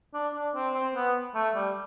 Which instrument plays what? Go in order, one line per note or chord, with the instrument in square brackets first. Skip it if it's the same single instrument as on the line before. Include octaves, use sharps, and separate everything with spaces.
[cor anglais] D4
D4
C4
C4
B3
A3
G3